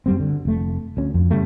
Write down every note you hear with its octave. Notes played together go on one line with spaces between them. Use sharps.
F#2 G3 C4
D3
F1 A3
D2 C#4
F2
C#3 G3 A3